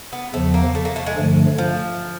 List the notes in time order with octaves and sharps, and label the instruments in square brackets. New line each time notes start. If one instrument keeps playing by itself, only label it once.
[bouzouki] B3
[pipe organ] E2 C#3 F3 [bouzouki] A3
[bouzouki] A#3
A3
A#3
A3
G#3
[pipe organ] G2 D3 F3 A3
[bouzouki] F3